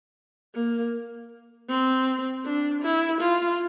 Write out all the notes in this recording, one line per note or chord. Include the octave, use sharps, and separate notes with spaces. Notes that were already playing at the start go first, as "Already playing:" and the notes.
A#3
C4
D4
E4
F4